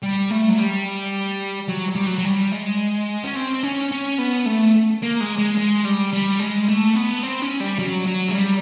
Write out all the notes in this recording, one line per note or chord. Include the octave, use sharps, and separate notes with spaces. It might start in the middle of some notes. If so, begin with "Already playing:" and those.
G3
A3
F#3
G3
F#3
G3
F#3
F#3
G3
G#3
C#4
C4
C#4
C#4
B3
A3
A#3
G#3
G#3
G#3
G3
G3
G#3
A3
B3
C4
C#4
G3
F#3
F#3
G#3
G3